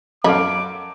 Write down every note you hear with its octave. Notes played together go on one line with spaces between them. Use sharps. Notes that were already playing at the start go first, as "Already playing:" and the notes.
F#2 A4 C#5 D#5 F5 B5 D6